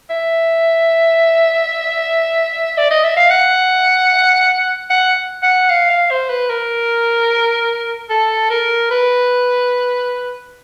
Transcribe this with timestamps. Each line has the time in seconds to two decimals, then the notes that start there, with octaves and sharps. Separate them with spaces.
0.10 E5
2.77 D5
2.91 D#5
3.04 E5
3.17 F5
3.30 F#5
4.90 F#5
5.43 F#5
5.70 F5
5.90 F5
6.11 C5
6.30 B4
6.50 A#4
8.10 A4
8.50 A#4
8.91 B4